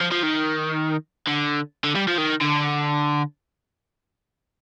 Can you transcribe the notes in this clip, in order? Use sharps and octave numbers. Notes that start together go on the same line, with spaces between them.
F3
F3
D#3
D3
D3
G3
F3
D#3
D3